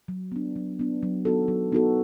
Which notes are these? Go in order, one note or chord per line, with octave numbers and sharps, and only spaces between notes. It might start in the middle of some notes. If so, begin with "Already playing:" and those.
F#3
B3 D4
F#3
B3 D4
F#3
B3 D#4 F#4 A4
F#3
B3 D#4 F#4 A4